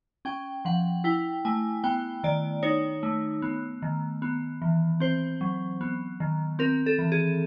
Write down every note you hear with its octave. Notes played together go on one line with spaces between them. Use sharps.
C#4 G5
F3 F#5
E4 G5
A3 G#5
B3 G5
D#3 D5
D#4 C#5
A3
B3
D#3
B3
E3
C4 C5
F#3
B3
D#3
C4 A#4
A4
E3
G#4